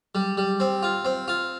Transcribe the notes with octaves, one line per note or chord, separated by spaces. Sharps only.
G3
G3
C4
F4
C4
F4